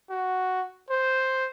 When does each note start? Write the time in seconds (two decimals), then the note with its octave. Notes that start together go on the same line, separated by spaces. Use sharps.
0.10 F#4
0.90 C5